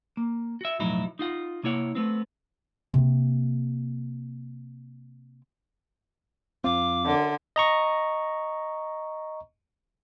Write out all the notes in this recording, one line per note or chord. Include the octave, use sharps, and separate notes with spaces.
A#3
F#4 E5
B1 F2 A2 F#3 D#4 E4
D#4 F4 F#5
C3 A#3 E4 C#5 F#5
A3 B3 C4
C3 A#3
F2 C4 F4 D6
F#2 D3
D#5 A#5 C#6